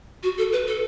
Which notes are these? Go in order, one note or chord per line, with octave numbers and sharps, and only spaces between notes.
F#4
A4
B4
A4